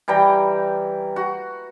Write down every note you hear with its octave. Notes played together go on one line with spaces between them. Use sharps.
E3 G3 G5 A#5
F#4